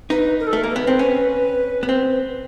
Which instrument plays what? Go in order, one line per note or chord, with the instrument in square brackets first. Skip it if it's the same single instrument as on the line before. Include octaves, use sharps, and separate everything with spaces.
[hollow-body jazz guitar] D#4 [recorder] B4
[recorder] A#4
A4
[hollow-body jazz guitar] A3 [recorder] A#4
[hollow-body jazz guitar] A#3
[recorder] B4
[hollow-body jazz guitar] B3
C4
C#4
B3
C4